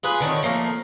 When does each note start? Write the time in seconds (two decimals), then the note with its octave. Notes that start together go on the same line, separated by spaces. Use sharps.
0.03 F4 G#4 B4
0.20 D3 D#3 B4 C#5
0.43 F3 A3 A#3